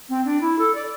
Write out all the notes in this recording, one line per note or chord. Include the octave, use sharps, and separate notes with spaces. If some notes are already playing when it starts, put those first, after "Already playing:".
C4
D4
E4
A4
D5